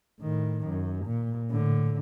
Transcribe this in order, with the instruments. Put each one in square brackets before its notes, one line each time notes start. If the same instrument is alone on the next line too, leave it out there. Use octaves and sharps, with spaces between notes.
[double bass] A2 D#3
F#2
A#2
A2 D3